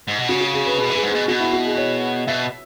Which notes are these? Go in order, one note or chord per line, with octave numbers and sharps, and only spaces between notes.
G#2
B2
C#3 F#4
F#4
G#4
B4
B2 G#4
B4
E3 G#4
G#2
B2 G#4
B2 F#4
E4
F#4
G#4
C#5
B2 E5